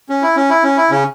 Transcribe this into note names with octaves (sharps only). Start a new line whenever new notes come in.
C#4
E4
C#4
E4
C#4
E4
C#3 C#4